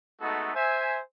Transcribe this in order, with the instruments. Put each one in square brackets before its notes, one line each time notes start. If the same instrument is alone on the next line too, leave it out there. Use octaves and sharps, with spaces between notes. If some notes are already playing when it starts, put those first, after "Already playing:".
[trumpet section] G#3 A3 B3 D#4 F#4 A4
C5 E5 G#5